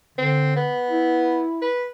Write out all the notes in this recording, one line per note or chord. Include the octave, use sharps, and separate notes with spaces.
D3 C4
B3
E4
B4